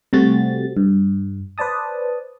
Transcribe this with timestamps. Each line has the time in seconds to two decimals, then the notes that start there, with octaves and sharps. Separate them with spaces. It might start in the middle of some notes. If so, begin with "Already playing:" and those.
0.13 C3 G3 A3 C4 F#4 A6
0.77 G2
1.58 B4 C5 D5 A5 D#6